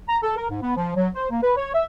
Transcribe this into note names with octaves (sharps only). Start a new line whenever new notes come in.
A#5
A4
A#4
G#2
B3
F3
F#3
C5
A#3
B4
C#5
E5